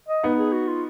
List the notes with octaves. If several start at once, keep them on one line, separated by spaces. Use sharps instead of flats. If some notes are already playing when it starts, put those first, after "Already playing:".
D#5
B3 D#4
G#4
F#4
F4